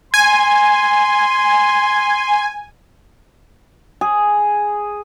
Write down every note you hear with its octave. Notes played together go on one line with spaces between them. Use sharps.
G#5 C6
G#4